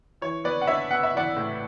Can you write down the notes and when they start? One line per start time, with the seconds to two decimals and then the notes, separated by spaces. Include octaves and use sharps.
0.22 E3 C#5
0.44 B3 B4 D5
0.61 F#5
0.67 D4 C#5 E5
0.90 B3 F#5
1.03 E5
1.14 E3 D5 F#5
1.37 A2